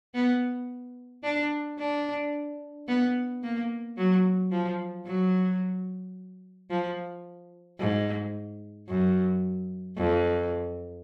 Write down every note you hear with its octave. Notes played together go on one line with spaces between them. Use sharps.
B3
D4
D4
B3
A#3
F#3
F3
F#3
F3
G#2
F#2
F2